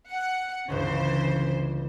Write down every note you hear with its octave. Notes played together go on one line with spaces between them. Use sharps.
F#5
G1 C#2 C#3 E3 C#4 C5